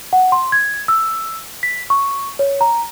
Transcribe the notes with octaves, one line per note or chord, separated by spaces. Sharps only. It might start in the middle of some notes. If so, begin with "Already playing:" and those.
F#5
C6
G#6
E6
B6
C#6
C#5
A#5